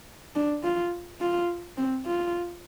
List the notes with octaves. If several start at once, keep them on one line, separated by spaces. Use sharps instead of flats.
D4
F4
F4
C4
F4